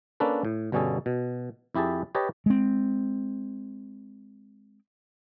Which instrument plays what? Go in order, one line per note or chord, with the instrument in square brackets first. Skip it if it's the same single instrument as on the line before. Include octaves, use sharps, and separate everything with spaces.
[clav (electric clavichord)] A#3 C#4 D4 A4 B4
A2
G1 B2 G3 C#4 G#4 A4
B2
F2 E4 G4 G#4 A5
G4 B4 C#5 D#5 A5
[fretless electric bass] G#3 C4